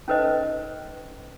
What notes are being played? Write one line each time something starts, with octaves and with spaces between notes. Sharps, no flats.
C#4 D#4 A4 B4 C5 D#5